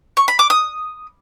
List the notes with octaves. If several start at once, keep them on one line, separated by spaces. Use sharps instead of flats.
C#6
B5
D6
D#6